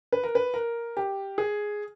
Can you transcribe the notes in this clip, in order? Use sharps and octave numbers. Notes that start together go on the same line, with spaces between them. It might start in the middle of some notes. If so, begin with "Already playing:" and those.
B4
A#4
B4
A#4
G4
G#4